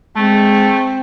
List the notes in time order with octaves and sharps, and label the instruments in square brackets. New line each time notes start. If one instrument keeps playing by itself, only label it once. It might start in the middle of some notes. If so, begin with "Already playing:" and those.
[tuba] G#3 [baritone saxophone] A3 [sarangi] C4